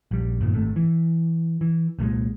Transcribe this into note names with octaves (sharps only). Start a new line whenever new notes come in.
A#1 G3
G2 A#2 D#3
G#1 C3 A3
E3
E3
C2 A#2 G3 G#3